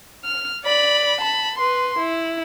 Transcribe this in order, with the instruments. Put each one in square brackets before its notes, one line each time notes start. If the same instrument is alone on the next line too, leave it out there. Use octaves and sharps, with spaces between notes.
[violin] F6
D5 B5
A5 B5
B4 C6
E4